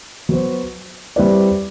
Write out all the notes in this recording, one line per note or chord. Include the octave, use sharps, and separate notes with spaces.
F#3 B3 F#4 C5
G3 C4 E4 B4 D5